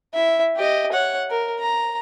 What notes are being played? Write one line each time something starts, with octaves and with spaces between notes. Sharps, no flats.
E4 E5
G4 D#5
C#5 F#5
A#4
A#5